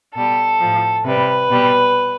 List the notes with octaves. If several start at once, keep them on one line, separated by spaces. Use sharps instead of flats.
B2 G3 A4
A2 F3
C3 G3 B4
B2 G3